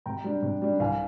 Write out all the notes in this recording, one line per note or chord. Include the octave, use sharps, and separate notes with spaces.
C3 G5 A#5
G3 D4
C3
G3 D4
C2 F5 G#5